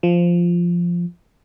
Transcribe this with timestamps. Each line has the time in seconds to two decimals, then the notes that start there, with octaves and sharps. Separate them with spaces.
0.03 F3